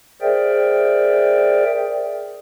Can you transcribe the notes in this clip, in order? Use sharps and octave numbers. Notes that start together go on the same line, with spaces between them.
G#4 A#4 C5 D5 E5 G5